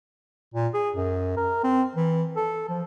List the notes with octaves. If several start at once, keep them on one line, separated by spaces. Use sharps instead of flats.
A#2
G#4
F#2
A#4
C4
E3
A4
F3